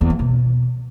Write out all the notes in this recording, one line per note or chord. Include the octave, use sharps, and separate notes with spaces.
E2
F3
B2